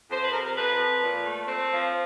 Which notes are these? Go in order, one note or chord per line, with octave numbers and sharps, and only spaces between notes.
F2 C5
B4
C3 A#4
F2 B4
F3
A#2
A3
C4
F3